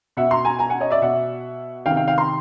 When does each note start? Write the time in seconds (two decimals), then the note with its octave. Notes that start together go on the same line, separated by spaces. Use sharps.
0.17 B2 E5 F#5
0.31 A#5 C6
0.45 G#5 A#5
0.59 G#5 A#5
0.70 F#5 G#5
0.80 C#5 D#5
0.91 D5 E5
1.02 B2 E5 F#5
1.86 C3 D#3 F5 G5
1.97 F5 G5
2.07 F5 G5
2.18 A#5 C6